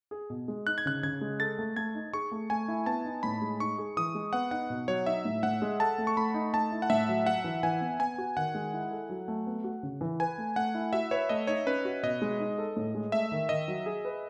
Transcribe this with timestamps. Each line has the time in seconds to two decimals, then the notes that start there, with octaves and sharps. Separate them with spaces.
0.11 G#4
0.30 B2
0.48 G#3
0.67 D#4 F#6
0.78 G#6
0.86 C#3 F#6
1.03 C#3 G#6
1.21 G#3
1.40 A4 A6
1.58 A3
1.76 A3 G#6
1.95 D#4
2.13 G#4 C#6
2.32 A3
2.50 A3 G#5
2.68 E4
2.86 B3 A5
3.05 D#4
3.23 A2 B5
3.42 G#3
3.60 D#4 C#6
3.78 G#4
3.97 E3 D#6
4.15 G#3
4.33 B3 F#5
4.51 D#4 F#5
4.70 B2
4.88 F#3 C#5
5.06 D#4 E5
5.25 A2
5.43 A2 F#5
5.62 G#3
5.80 A4 A5
5.98 A3
6.07 C#6
6.17 A3 B5
6.34 D#4
6.54 A3 A5
6.72 E4
6.82 F#5
6.90 A2 E5
7.08 F#3
7.26 F#4 F#5
7.44 E3
7.63 E3 G#5
7.81 B3
7.99 B3 G#5
8.18 F#4
8.37 D#3 F#5
8.54 G#3
8.73 E4
8.91 A4
9.09 F#3
9.28 A3
9.47 B3
9.64 F#4
9.83 C#3
10.01 E3
10.20 B4 G#5
10.38 A3
10.56 A3 F#5
10.75 E4
10.93 F#4 E5
11.11 B4 C#5
11.29 A3 D#5
11.47 D#4 C#5
11.66 C#4 B4
11.85 F#4
12.03 B2 D#5
12.22 G#3
12.40 D#4
12.58 A4
12.77 A2
12.95 G#3
13.12 A3 E5
13.32 D#3
13.49 D#3 D#5
13.68 F#3
13.86 G#4
14.05 B4